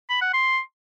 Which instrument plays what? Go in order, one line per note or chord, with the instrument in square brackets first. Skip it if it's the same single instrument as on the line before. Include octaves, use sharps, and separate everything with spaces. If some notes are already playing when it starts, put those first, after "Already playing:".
[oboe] B5
F#5
C6